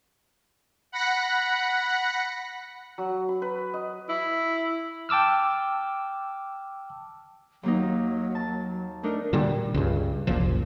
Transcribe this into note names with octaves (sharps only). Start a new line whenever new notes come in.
F#5 B5 F#6 A#6 C#7
F#3
B5
B4
D#5
E4
G5 A5 D6 E6 F6
D#2 F#3 A#3 D#4
A5
A3 D4 D#4 A#4
A#2 D3 G3
C#2 G2
F#1 C2 A#2 F3